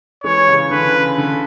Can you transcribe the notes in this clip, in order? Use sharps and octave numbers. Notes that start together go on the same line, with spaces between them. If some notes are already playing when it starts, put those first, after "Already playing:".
E3 G#3 C#5
C#3 E3
D3 B4
C#3
D3